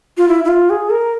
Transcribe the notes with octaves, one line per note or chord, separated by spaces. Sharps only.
F4
E4
E4
F4
G#4
A#4